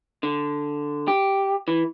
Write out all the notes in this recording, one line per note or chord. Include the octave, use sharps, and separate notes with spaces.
D3
G4
E3